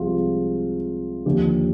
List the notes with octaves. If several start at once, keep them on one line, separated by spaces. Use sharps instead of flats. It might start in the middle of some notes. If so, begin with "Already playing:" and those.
Already playing: C2 C3 F3 G#3 F4
D#2 D3 F3 G4